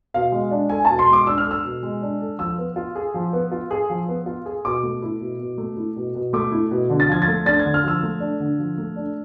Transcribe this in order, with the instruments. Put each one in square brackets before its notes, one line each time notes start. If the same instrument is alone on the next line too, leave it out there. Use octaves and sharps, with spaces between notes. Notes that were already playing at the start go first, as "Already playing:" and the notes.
[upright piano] B2 [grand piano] F5
[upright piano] G#3
D4
[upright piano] A4 [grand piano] G#5
[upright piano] B2 [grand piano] A5
[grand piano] C6
[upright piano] G#3
[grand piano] D6
[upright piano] D4 [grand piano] E6
[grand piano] F6
[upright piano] A4
[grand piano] E6
[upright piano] B2
G#3
D4
A4
[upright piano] F3 [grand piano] E6
[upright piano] B3
F4
G#4
F3
B3
F4
G#4
F3
B3
F4
G#4
[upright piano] B2 [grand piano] D6
[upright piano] A3
E4
B2
B2
A3
E4
B2
B2
[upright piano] A3 [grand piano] D6
[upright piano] E4
B2
D3
[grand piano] A6
[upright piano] F3 [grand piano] G#6
[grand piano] A6
[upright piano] A3
[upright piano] D4 [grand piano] A6
[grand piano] G#6
[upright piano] D3
[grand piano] F6
[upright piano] F3 [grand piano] E6
[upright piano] A3
D4
D3
F3
A3
D4